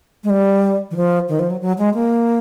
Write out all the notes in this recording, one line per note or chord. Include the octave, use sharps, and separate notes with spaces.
G#3
G3
E3
F3
D#3
F3
F#3
F#3
G#3
A#3